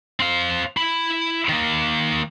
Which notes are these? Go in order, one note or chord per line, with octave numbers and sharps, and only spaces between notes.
C4 F5
E4 B5
D#3 A#3